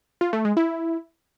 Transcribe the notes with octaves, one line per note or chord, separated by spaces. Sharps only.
F4
A3
G#3
E4